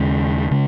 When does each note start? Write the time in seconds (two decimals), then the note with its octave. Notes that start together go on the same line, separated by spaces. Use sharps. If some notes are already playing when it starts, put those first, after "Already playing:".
Already playing: D#2 C#3 G#3
0.51 C#3 G#3